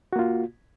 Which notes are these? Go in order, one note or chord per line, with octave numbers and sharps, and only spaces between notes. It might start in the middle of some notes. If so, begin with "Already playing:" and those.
A#3 F4 F#4